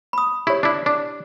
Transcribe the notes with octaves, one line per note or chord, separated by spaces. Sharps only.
B5 D#6
E4 G4 C#5
D4 E4
D4